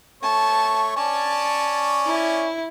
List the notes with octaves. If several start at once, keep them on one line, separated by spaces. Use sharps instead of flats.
A3 C#5 A5
C#4 C#5 D5 A5
E4